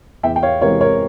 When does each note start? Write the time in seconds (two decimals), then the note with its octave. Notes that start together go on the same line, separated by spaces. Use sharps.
0.23 E2 E5 G5
0.36 G5
0.43 C#5 F5
0.61 C3 E3 G#3 C4 A#4 C#5
0.81 A#4 C#5